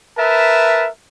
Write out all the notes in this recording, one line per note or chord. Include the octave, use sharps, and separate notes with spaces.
A#4 B4 E5 A5